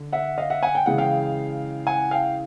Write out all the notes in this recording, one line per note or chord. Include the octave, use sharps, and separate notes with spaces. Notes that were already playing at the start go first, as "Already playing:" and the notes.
Already playing: D3
E5 F#5
D#5 F5
E5 F#5
F#5 G#5
G5
C#3 E3 G#3 F#5
F5 G5
F#5 G#5
F5 G5